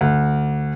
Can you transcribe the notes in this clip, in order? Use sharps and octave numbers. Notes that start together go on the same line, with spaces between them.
D2